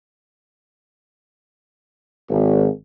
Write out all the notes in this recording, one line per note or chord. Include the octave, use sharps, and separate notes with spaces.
G#1